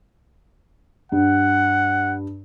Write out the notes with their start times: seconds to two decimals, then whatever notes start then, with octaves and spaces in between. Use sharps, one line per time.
1.12 G2 F#5